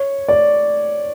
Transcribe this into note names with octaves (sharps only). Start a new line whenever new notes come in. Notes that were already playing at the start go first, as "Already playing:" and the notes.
Already playing: C#5
D5